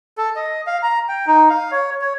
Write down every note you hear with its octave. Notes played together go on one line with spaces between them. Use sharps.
A4
D#5
F5
A#5
G5
D#4
F5
C#5
C#5